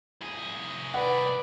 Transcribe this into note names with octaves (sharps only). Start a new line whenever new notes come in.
C2 G#4
B4 D5 F#5